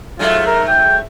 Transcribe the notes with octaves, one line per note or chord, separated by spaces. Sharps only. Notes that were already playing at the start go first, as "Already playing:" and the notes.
G#2 F#3 A3 F4
A#4
G5